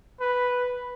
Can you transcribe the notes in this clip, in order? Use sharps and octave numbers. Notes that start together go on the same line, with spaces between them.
B4